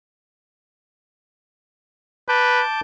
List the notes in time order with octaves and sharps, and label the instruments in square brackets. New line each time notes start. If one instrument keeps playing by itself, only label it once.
[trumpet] B4 [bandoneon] A5 D6 G6